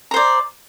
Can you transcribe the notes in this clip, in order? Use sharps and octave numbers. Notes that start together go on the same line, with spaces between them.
C5 D5 A#5